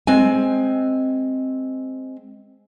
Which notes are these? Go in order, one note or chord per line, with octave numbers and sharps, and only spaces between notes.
G#3 C4 G#5